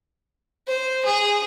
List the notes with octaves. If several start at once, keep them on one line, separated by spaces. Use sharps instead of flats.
C5
G#4